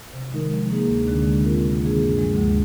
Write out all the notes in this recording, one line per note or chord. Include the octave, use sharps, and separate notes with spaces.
C3
D#3 G#3 D#4 A#4
F3
A#3 D#4 G#4
D2
D3 G#3 D4
D3
G#3 C4 F4 A#4
C3
D#3 A#3 D4 G#4
G2
F3 G#3
D2